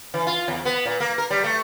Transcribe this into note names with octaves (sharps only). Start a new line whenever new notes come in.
E3
F4
E2
B3
A#2
A#3
A#4
G3
A3